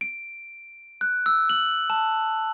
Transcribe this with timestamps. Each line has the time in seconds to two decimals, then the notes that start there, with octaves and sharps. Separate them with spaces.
0.01 D7
1.01 F#6
1.26 E6
1.50 F#7
1.90 A5